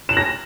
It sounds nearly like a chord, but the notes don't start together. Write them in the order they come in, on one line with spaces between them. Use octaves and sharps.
E7 F#7 A#6